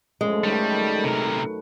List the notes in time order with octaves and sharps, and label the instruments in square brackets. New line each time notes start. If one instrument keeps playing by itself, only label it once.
[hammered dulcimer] F#2 A2 F3 [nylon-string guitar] G#3
[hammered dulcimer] D#3 A3 [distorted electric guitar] G3
[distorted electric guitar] C3 A#4 [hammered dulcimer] B4